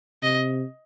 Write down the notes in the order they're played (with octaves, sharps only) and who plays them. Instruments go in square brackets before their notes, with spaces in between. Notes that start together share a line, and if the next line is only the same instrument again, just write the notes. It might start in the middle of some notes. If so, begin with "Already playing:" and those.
[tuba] C3 [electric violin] D#5